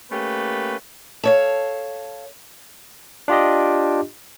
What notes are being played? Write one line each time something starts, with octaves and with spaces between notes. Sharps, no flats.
A3 A#3 C#4 G4 B4
A4 C#5 F5
D4 F4 G4 D#5